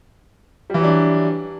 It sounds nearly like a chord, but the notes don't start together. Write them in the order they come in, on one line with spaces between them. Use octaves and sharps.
G3 E3 F#3 D4